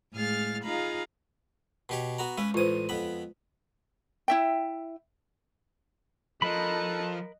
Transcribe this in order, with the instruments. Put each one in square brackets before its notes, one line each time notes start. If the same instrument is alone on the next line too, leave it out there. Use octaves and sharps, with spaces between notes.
[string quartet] A2 G#3 G#4 F5 F6 A6
D#4 F4 G#4 F5 A#5 B5
[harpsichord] B2 G4 C#5
B3 F#4 A#5
[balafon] G#3 [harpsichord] C#4 B4
[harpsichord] A1 D#6 [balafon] F4 B4 C5
[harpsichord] F2 B3 B5
[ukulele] E4 E5 G5
[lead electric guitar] F3 [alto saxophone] A4 [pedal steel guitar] A#4 B5 [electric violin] D#5 F#6